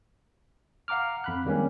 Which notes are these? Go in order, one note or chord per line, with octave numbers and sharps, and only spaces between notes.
F5 F#5 A#5 D6 F6
F2 B5 F#6
D#3 G3 G#3 A#3 C4 C#4